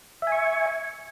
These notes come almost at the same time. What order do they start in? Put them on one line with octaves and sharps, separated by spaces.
E5 G#5 C#6